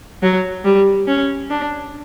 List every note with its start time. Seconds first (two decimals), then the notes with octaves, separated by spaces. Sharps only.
0.22 F#3
0.64 G3
1.07 C#4
1.50 D4